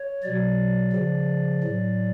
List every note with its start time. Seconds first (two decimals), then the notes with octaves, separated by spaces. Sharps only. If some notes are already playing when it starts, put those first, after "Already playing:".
Already playing: C#5
0.23 B2 F#3 D5
0.93 C#3 F3
1.63 A2 F#3